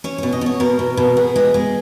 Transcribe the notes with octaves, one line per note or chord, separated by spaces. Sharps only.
C#4 C#5
B2 C#5
D#5
B2 C#5
B2 A#4
B2
B2
B3 G#4
G#3
G#3